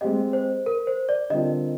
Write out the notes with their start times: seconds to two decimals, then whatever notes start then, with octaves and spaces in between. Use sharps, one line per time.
0.01 G#3 C4 G4 D#5
0.33 C5
0.66 A#4
0.87 C5
1.09 D5
1.30 D3 G3 C4 F4 A#4 D#5